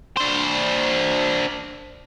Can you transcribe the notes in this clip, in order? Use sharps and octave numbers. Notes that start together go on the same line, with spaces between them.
D4 C5